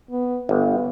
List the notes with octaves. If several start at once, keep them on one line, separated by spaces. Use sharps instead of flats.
B3
G1 B3